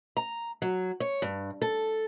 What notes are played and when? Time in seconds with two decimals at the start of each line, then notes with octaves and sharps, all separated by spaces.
0.17 A#5
0.62 F#3
1.00 C#5
1.22 G2
1.62 A4